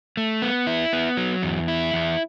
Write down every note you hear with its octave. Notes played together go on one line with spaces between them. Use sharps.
A3
B3
E4
B3
F#3
E2
E4
E2